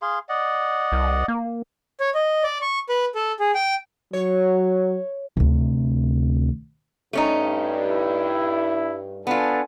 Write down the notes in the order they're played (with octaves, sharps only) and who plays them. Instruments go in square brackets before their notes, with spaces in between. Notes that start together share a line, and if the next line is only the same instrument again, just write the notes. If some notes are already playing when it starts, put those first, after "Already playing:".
[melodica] G#4 F5 C6
D5 D#5 F#5
[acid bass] C2
A#3
[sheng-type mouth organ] C#5
D#5
D5
C#6
B4
A4
G#4
G5
[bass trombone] F#3 [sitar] C#5
[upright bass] D2 C3
[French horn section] G2 [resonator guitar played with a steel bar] A3 C#4 D#4
[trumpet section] E4
[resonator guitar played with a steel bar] B3 F4 [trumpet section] D4 A4 G#5